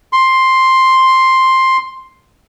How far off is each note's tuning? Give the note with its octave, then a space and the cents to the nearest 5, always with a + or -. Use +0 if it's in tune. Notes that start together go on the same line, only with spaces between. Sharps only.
C6 +5